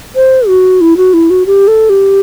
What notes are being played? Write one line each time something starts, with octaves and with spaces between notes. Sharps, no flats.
C5
F#4
E4
F#4
E4
F#4
G4
A4
G4